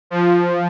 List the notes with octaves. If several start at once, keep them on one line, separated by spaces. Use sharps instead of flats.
F3